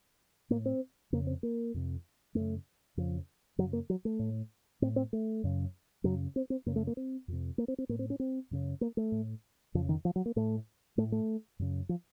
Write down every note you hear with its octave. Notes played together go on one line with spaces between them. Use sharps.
A2 A#3
C4
F2 C#3 A#3
C4
A#3
F2 C3
F#2 C#3 A3
F2 C#3 F3
F#2 C#3 F#3
A#3
F#3
A3
A2
A2 C4
C4
A3
F#2 C#3
F#2 C#3 F#3
C4
C4
F#2 C#3 A#3
A3
A#3
C4
F2 C3
A#3
C4
C4
A2 A#3
C4
C#4
C4
F#2 C#3
A#3
A3
A2
F2 C#3 F3
D#3
F3
F#3
A#3
A2 A3
A2 A3
A3
F#2 C#3
F3